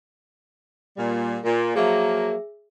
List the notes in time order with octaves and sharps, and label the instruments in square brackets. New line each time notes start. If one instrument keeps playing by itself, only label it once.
[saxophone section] A#2 G3
A#2
[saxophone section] F3 F#3 A#3 [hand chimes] G#4 E5